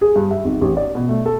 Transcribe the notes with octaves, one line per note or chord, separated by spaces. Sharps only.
G#4
G2
E5
G#1
A1
D5
B2
A3
A4